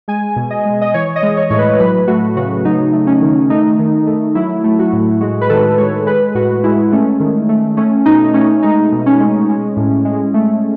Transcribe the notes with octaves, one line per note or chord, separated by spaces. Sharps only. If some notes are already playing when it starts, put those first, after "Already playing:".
G#3 G#5
B2
D#5
G#3
D#5
E3 C#5
D#5
G#3
C#5
A2 C#5
B4
F#3 B4
A3 F#4
C#3 F#4
F#3 D#4
A3
C#4
D#3
A3 D#4
D#3
A3
F#3 E4
A3
F#4
A2
G#3 F#4
B4
D#3 A4
G#3 C#5
G#3 B4
A2 F#4
G#3 E4
A3 C#4
D#3
A3
A3 C#4
B2 D#4
A3 C#4
G#3 D#4
B2
C#4
G#3
G#3
A2
G#3
A3